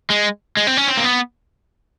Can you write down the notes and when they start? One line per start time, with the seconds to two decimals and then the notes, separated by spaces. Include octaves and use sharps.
0.10 G#3
0.57 G#3
0.67 C4
0.77 C#4
0.87 C4
0.97 A#3
1.04 B3